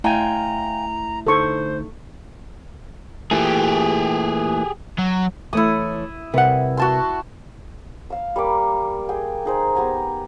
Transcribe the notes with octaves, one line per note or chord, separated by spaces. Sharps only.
A3 E4 E5 F5 G5 G#5 A#5
D2 D#4 A4 C5 C#6
A#2 E3 A3 G4 G#4
F#3
E3 A3 E4 C#5 D#6
C3 G3 A#4 B4 F#5
F#4 A5 C6
F5 E6
G3 A#3 C#6 D6
G#4 G5 G#5
D#4 G#4 C5
B3 G4 G#5 A#5